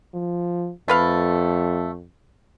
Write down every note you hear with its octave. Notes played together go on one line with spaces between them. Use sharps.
F3
F2 A3 B4 F5